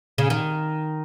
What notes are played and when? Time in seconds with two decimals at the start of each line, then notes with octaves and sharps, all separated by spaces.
0.18 C#3
0.30 D#3